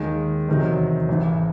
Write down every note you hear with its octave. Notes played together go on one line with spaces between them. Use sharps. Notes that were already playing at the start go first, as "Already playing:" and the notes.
Already playing: D#2 D#3 G#3
E2 C3 D#3 F#3
G#1 G#2 E3